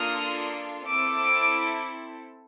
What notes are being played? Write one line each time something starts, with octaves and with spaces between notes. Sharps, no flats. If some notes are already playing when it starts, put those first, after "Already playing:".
Already playing: A#3 D4 F4 A4 D#6 F6
C4 E4 A4 D6 E6